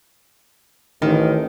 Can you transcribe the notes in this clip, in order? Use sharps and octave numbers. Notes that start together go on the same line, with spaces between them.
A1 D#3